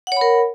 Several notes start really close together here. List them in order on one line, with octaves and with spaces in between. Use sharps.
F#5 C#5 B5 A#4